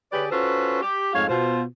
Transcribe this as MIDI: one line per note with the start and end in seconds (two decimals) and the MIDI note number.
0.12 0.26 50
0.12 0.26 67
0.12 0.26 68
0.12 0.26 71
0.12 0.26 73
0.12 0.26 74
0.31 0.80 61
0.31 0.80 65
0.31 0.80 66
0.31 0.80 69
0.31 0.80 71
0.31 0.80 72
0.82 1.10 67
1.13 1.26 41
1.13 1.26 44
1.13 1.26 57
1.13 1.26 73
1.13 1.26 77
1.29 1.62 47
1.29 1.62 65
1.29 1.62 72